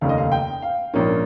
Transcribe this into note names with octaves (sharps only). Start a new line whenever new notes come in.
F1 D#2 C#3 F5
D#5
F5
G5
F5
A#1 G#2 F3 A#3 C#4